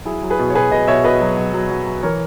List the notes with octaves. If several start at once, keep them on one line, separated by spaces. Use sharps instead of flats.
F#3 E4 G#4
F#3
G#4 B4
B2
C#5
B2 G#4 B4
B2 B4 D#5
B2 C#5 E5
B2 B4 D#5
F#3
F#3
F#3
F#3
F#3
E3 A#4 C#5